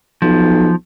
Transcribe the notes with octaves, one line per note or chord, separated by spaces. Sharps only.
B1 F3